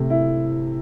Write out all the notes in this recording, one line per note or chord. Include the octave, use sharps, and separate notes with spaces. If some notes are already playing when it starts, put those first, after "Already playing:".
Already playing: C3 A3
E4